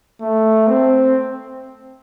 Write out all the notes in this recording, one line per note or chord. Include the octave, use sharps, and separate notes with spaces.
A3
C4